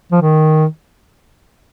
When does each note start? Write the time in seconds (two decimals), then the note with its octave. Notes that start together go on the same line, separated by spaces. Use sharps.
0.12 F3
0.22 D#3